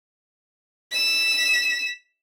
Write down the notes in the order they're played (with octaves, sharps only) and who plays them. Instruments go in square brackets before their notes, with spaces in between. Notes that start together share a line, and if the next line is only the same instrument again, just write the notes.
[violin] B6 E7